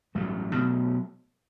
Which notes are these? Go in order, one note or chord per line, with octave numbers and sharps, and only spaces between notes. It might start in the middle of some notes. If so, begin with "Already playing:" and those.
A1 G2 F#3 A3
B2 F#3 A3